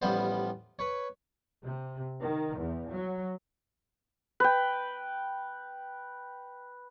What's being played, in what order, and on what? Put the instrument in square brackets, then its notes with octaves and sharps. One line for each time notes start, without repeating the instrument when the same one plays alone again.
[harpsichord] A1 F3 G3 B3 C5
B4 C#5
[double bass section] C3
D#3
E2
F#3
[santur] B4 G5